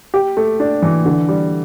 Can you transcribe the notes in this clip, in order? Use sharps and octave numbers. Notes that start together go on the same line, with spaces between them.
G4
A3
D4
E3
D3
G3